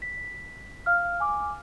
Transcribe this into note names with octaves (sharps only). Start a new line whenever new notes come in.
B6
F5 F6
G#5 D6